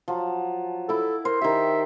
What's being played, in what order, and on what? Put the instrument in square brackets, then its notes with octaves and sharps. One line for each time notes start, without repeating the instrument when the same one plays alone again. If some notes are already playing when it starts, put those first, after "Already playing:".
[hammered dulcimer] F3 F#3
[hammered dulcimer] E4 D6 [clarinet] A4
[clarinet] A#4 [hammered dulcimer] C5
[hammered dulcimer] D#3 G4 [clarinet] E5